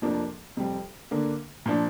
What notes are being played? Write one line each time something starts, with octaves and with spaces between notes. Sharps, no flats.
F2 C3 F3 A#3 D4
F2 C3 G3 C4
D3 A#3 D4
A#2 F3 D4